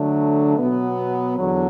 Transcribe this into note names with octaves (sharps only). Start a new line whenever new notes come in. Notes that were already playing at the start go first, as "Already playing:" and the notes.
Already playing: D3 F#3 A3 D4
B2 F#3 B3
E2 D3 F#3